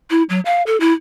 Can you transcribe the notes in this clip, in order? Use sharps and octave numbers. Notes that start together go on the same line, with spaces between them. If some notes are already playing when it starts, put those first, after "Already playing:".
E4
F#3
F5
A4
E4